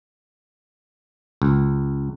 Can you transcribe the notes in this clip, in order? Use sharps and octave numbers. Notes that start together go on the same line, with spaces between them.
C#2